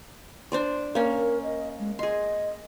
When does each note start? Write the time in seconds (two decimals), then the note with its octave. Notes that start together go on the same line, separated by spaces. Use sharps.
0.52 D4 C5 D5
0.95 A#3 C#4 A#4
1.43 D#5
1.79 G#3
1.99 G#4 D#5 C6